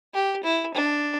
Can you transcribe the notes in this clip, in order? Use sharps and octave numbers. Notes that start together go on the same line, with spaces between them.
G4
E4
D4